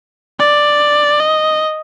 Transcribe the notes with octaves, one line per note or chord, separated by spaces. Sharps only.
D5
D#5